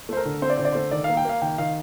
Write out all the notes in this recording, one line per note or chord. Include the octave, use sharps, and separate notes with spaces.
A3 C5
A#4
D3
C4 C5
D5
D3 C5
D5
A3 C5
D#3 D5
F5
A#3
G5
A#3 F5
D#3 G5
D#3 F5